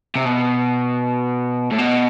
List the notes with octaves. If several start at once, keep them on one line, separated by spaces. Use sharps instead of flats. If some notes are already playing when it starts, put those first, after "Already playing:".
C3
B2
A2
B2